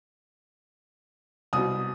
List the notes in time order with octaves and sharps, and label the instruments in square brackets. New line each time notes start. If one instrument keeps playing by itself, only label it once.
[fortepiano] C2 B2 [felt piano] D#6